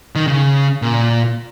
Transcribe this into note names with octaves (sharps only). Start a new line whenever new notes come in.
D#3
C#3
A#2